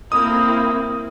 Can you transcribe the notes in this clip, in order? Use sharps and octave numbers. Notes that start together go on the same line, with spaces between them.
A#3 C4 E4 D#6